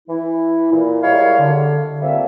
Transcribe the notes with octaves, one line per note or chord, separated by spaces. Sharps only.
E3 E4
A#2 E4
G3 G#3 E4 A#4 C#5 F5
D3
F3 G3 A3 A#3 C4 E5